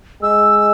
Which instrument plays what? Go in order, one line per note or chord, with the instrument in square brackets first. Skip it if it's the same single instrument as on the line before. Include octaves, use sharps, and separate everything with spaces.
[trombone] G#3 [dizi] E6